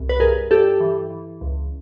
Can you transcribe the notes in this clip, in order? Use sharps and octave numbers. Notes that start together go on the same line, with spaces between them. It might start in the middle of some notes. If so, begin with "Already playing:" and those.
Already playing: C2
B4
G2 G#4 A#4
G2 G4 A4
E3
E3
C#2